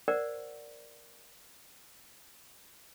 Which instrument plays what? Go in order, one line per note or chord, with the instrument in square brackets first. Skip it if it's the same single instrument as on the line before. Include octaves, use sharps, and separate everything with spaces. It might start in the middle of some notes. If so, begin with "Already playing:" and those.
[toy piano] A#4 C5 D5 F#5